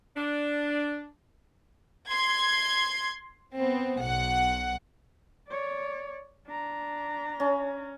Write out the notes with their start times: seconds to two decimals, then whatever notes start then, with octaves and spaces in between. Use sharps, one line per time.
0.17 D4
2.09 C6 G#6
3.55 B3 C4
4.01 B1 F#5
5.48 C#5 D5
6.47 D4 A#5
7.40 C#4